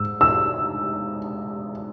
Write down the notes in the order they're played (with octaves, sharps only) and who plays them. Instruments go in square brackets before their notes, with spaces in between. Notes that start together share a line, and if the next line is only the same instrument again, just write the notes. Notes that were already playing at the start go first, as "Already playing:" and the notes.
Already playing: [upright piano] G#2 E6
E6